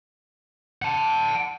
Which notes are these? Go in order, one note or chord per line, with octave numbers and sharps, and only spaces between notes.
F#5 A5